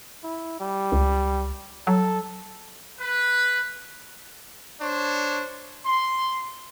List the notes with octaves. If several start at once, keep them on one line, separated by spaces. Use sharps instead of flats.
E4
G3
C#2
F#3 A4
B4
D4 C5 C#5
C6